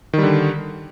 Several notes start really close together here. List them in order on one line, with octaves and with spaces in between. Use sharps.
D#3 G3 D3